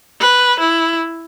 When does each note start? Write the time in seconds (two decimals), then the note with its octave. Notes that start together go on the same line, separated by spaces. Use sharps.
0.20 B4
0.59 E4